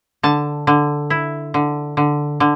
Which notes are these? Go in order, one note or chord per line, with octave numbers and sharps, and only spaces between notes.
D3 A5
D3
E4
D3
D3
D3